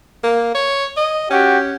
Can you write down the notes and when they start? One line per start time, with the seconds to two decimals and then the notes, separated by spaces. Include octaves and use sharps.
0.23 A#3
0.55 C#5
0.97 D#5
1.30 C#4 F#4 G4